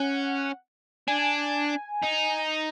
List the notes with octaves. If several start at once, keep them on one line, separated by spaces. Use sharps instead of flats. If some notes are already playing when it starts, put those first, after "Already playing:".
Already playing: C#4 F#5
D4 G#5
D#4